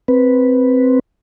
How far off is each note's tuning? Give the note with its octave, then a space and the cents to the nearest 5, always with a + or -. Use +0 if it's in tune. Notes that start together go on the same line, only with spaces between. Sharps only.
C4 +0 B4 -5